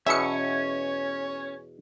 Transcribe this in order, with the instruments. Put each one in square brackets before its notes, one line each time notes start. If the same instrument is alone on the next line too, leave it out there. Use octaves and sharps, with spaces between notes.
[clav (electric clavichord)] E2 B2 [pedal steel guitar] C#4 [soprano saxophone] C#5 [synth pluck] E5 C#7